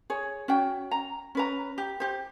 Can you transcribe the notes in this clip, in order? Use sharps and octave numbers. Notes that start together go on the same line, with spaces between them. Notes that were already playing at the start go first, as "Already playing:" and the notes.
G#4 C#5
C#4 F#4 G5
A#5
C#4 B4 A#5
G4
G4 C5